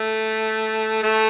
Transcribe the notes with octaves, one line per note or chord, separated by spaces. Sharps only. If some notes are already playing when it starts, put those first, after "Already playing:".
Already playing: A3
A3